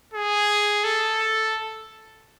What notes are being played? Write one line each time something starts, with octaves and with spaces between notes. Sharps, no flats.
G#4
A4